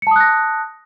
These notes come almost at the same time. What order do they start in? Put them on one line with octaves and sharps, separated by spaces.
C#7 A5 D#6 F#6 A#6